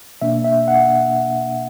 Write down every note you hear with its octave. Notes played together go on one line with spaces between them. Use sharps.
B2 A#3 D4 E5
E5
F#5